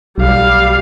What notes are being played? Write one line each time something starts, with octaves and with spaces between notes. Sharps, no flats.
B1 G3 F5